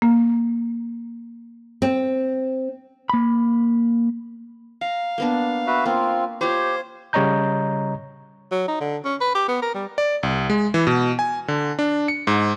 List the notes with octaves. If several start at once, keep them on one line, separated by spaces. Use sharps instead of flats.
A#3
C4
A#3 B5
F5 A#5
A#3 B3 D4
F#4 B4 E5
A#3 C4 F4
F4 G4 C5 C#5
C#3 G3 C#5 D#5 A#5 G6
F#3
D#4
D3
C#4
B4
G4
B3
A#4
G3
D5
C2
G#3
E3
B2
G#5
D3
D4
C#7
G#2